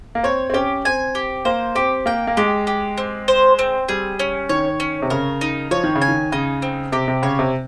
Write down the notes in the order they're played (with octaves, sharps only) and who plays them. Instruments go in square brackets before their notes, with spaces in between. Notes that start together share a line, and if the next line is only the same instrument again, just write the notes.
[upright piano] A#3
[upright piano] C4 [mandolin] C#5
[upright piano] C4
[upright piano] C#4 [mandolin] G4
[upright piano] C4 [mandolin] G#5
[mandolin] G4
[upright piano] A#3 [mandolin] C5
[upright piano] C4 [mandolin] G4
[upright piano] A#3 [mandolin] G5
[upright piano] A#3
[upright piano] G#3 [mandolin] G4
[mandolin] G4
C4
C5
C4
[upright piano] G3 [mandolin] G#4
[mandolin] C#4
[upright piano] D#3 [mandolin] C#5
[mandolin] C#4
[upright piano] C3
[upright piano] C#3 [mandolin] A#4
[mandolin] D#4
[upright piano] F3 [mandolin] C#5
[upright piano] D#3
C#3
[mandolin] G#5
[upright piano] D#3
[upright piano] C#3 [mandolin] D#4
[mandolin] C4
[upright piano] C3 [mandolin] G4
[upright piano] C3
[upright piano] C#3 [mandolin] C#5
[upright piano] C3